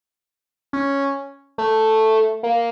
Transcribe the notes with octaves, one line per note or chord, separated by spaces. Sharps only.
C#4
A3
A#3